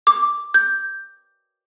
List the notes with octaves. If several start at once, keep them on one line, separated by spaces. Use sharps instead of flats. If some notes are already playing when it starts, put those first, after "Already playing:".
D6
G6